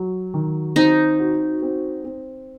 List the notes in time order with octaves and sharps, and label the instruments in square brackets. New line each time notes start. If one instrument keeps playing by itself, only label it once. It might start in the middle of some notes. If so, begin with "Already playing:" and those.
Already playing: [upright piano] F#3
D#3
[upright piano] C4 [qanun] D#4
[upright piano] F#4
C4
C4